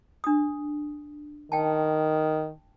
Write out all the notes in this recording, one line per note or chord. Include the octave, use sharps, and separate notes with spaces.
D4 D#6
D#3 G5 A5